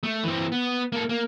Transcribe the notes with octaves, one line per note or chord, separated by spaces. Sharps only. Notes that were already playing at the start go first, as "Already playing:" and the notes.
A3
E3 C4
B3
A#3 A4
A#3